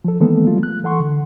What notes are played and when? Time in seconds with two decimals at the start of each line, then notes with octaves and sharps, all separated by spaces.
0.05 F3 A4
0.20 D#3 E3 G#3 A#3 B3 A4
0.47 F#3 G3 A3 F4
0.63 F#6
0.83 E3 A4 F#5 C6 C#6
1.00 D3